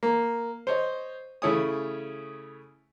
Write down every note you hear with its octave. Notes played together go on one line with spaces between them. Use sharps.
A#3
C5 C#5 D#5
C#3 A3 E4 C#5 G#5 D#6